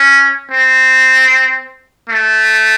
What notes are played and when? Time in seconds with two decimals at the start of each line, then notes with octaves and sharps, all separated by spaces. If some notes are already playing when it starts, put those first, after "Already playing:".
Already playing: C#4
0.51 C4
2.09 A3